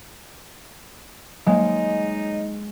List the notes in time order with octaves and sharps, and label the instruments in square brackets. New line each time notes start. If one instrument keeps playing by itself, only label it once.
[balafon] F#3 A#3 [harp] G#3 [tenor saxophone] D#4 [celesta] C#5 D#5